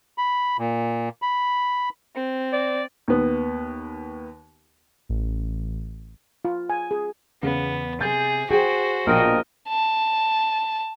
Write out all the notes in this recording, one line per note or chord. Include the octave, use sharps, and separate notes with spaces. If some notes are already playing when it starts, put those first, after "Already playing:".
B5
A#2
B5
C4
D5
D#2 B3
A1
F4
G#5
G#4
E2 C#3 B3
C3 G#4 G6 A6
F#4 G#4 C5 G5
A#1 B2 F3 A#4 D#5 G5
A5